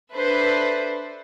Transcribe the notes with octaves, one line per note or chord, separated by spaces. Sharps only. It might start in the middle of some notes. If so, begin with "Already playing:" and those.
D4 A4 B4 C5 E5